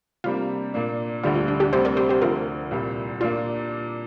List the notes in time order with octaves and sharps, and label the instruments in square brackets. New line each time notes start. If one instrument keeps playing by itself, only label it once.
[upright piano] C3 G3 A#3 D4 [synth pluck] F4
[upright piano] A#2 A#3 D4
[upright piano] D2 D3 G3 [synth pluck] F4
[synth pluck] F4
D4
D4 G4
[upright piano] D2 C3 G3 D4 [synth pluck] G4 C5
[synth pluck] A#4 D5
G4 C5
G4 C5
[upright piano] D2 D3 F3 [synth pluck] F4 A#4
[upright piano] C2 A#2 G3
[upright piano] A#2 A#3 D4 [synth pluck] F4